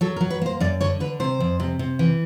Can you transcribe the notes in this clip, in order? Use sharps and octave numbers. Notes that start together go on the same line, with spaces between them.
F#3 A4
A#4
F#3
B4
A#3 C5
F#2 D5
D3 C#5
D3 B4
C3 C5
F2
C3
C3
E3